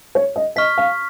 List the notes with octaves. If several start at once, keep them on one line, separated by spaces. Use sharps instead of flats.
C#5
D#5
D#5 C#6 F6 B6
F5